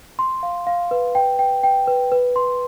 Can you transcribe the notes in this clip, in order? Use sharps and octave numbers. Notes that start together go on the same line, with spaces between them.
C6
F5
F5
B4
G5
G5
G5
B4
B4
C6